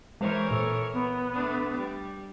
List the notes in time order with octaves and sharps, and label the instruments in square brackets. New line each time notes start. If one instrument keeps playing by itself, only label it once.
[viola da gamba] E3 A#4 C#5 [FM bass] G#3 [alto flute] C5
[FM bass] A#2 [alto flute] A4
[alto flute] B3
[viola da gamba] A3 D4
G3